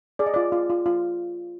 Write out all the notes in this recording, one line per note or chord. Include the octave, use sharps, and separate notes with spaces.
G#4 D5
D#5
F4 D5
F4
F4
F4